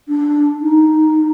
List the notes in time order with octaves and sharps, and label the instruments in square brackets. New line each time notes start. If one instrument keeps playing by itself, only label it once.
[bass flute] D4
D#4